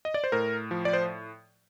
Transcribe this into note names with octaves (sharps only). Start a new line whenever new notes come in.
D#5
D5
C5
A2 A#4
F3
D5
C5